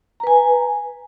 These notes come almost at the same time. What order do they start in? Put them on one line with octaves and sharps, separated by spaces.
A#5 B4 G#5